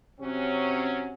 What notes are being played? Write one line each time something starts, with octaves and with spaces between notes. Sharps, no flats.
C3 F#3 C#4